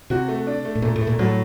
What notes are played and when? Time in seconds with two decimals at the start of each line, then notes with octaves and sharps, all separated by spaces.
0.10 C3 F#4
0.28 A3
0.47 D4
0.65 A3
0.75 A2
0.82 A#2 A3
0.96 A2
1.01 A3
1.07 A#2
1.19 A2 F#3